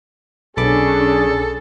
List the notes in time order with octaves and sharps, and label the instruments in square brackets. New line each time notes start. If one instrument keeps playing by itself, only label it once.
[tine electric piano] B1 B5 D6 [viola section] C#4 D4 [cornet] G#4 [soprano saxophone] A4